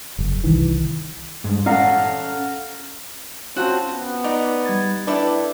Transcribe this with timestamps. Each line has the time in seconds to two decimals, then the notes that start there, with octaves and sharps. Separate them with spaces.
0.19 F#1
0.44 C2 D#3 E3
1.44 G2 G#3
1.66 C#4 A4 F5 F#5 A#5
3.56 C4 C#4 F4 F#4 A5
3.90 B3
4.24 D#4 D5
4.66 G3 G#6 A6
5.07 D4 E4 A4 B4 D5 G5